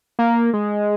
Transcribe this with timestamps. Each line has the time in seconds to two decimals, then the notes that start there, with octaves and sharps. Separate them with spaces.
0.19 A#3
0.54 G#3